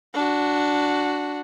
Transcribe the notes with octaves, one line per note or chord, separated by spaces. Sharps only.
D4 F#4